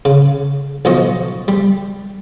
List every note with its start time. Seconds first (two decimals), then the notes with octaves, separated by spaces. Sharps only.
0.05 C#3
0.85 B1 F3 D#5 C#6
1.48 G3